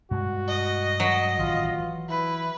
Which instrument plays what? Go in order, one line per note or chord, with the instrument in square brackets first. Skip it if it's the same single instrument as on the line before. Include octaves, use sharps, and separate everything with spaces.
[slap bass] G2 B2 G#3 [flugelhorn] F#4
[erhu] D#5
[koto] F#3
[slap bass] A1 D#3 [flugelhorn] F4
[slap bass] E3
[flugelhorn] E4 [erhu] B4